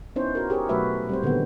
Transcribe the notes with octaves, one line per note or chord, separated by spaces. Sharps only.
B3 C#4 D#4 E4 C5 C#5
F#4 A#4
G4 G#4 A#4 C5 C#5
B2 F#3 A3 F#4 B4 E5
G3 C4 C5
A#2 D3 D#3 F3 B3